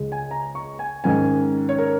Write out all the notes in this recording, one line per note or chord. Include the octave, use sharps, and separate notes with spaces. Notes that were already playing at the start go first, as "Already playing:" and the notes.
Already playing: C#2 C#3 G#3
G#5
A#5
C#6
G#5
G#2 D#3 C#4 G#5
C#5
A#4